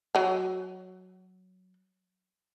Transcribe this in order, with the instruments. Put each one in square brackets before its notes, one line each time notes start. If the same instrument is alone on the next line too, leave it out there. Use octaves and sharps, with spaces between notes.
[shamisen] F#3 A#5